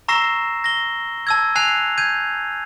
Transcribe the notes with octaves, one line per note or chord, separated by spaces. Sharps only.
A#5 C#6 E6 A#6 C7 E7
A#6 G7
A5 E6 G#6
G#5 A5 F#6 C7 F7
G6 G#6 D#7